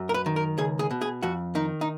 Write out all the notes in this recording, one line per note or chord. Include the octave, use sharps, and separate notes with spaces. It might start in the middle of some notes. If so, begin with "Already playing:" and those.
Already playing: F#2
A#4
B4
D#3
A#4
C#2 G#4
G#4
B2
G#4
F2 F#4
D#3 D#4
D#4